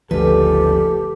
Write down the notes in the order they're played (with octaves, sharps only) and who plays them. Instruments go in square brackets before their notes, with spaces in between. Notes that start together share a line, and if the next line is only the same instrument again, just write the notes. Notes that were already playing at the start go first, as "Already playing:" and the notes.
[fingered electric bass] F#1 D2 F3 [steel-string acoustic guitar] C#4 B4 [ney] G4 [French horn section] A4